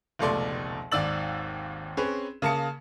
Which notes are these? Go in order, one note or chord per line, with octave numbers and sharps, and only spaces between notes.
F1 C#2 B2 A3 D5 C6
G#1 D#2 D5 E6 A6 F#7
C4 C#4 G#4 B4
C#3 A#3 A5 D#6 C#7